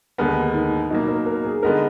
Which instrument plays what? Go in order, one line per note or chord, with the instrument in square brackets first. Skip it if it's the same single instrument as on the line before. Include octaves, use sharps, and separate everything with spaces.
[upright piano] D#2 D3 G#3 B3 [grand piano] A#4
[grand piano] D#4
[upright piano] B2 F#3 A#3 [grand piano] D#4
[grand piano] A#4
A#4
G#4
[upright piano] D3 G#3 B3 D#4 [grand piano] A#4